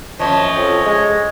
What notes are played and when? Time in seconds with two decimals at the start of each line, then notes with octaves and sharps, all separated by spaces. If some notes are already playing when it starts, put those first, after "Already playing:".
0.19 F#2 F3 C#5 D#5
0.56 F2
0.86 G#3